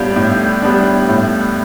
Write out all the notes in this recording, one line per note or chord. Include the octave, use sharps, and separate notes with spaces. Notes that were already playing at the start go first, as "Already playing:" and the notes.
Already playing: A2 G3 B3 D4 F4 G4
A2
G3 B3 D4
A2